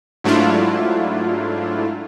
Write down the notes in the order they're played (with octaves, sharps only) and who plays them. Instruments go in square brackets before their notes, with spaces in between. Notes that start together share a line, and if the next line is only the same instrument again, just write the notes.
[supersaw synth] G#2 F#3 A3 D4 E4 F4